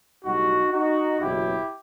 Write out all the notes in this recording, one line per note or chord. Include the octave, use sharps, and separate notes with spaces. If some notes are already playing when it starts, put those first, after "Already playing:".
B1 A2 G3 D#4 F#4
D#4 F#4
F#1 E2 B2 F#3 E4 G4